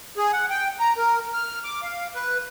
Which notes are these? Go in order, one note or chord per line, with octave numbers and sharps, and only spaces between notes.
G#4
F#5
G5
A#5
A#4
F6
D6
F5
B4